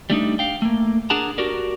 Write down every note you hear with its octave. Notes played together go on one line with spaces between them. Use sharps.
G3 A3 D4 D#4
F5 G5
A3 A#3
D4 G#4 A#4 F#5 A5 A#5
F#4 G4 A#4 D5